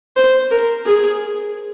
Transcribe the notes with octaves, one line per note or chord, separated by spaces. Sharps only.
C5
A#4
G#4